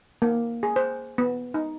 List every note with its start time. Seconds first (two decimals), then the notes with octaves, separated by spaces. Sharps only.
0.22 A#3
0.63 G#4
0.76 C5
1.18 B3
1.54 D#4